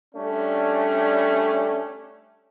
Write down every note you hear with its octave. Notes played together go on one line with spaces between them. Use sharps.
G3 A3 C#4 D4